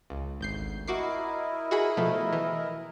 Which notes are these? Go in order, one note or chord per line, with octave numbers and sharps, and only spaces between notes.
C#2
G#1 D2 G6 C7
E4 F#4 A#4 D#5 D6 C7
F#4 G#4 B5
B2 F3 A3
E3